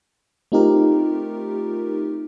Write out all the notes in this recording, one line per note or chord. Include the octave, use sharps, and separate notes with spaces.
A3 C4 D#4 F4 G4 A#4